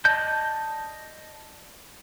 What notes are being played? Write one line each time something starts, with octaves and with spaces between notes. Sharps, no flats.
D5 D#5 A5 G6